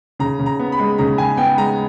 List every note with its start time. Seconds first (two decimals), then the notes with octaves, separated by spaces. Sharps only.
0.19 C#3 A#5
0.39 C#3
0.46 A#5
0.60 B3
0.72 B5
0.80 G#3
0.98 C#3 A#5
1.18 C#3 G#5
1.37 B3 G5
1.57 G#3 A#5